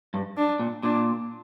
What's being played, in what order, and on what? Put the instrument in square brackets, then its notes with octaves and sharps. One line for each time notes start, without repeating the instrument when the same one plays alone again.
[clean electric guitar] G2
[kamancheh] D4
[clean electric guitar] A#2
[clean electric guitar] A#2 [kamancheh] D4